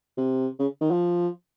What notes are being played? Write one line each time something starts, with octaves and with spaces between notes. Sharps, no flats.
C3
C#3
D#3
F3